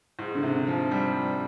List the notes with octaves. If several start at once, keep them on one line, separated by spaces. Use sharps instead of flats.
G#2
D3
C3
F3
G3